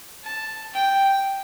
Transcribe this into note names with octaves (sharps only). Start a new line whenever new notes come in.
A5
G5